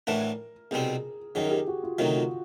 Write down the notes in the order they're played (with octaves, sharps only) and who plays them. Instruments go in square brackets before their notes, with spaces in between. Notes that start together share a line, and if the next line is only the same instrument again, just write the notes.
[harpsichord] A2 E3 A3 D4 F#4 [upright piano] A#4
[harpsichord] C2 B2 G3 C4 [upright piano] G#4
[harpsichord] F#2 D#3 F#3 [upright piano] G#4
[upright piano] G4
F#4
F4
[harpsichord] D2 C3 D#3 F#3 [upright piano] F#4
[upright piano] F4